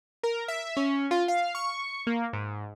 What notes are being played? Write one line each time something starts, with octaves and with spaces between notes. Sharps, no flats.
A#4
E5
C#4
F4
F5
C#6
A#3
G#2